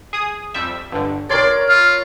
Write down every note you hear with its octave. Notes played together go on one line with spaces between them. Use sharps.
G#4 D#6
F2 G3 E5
G1 G2 D3
B1 A#4 C#5 D5 C6 D7
F4 F6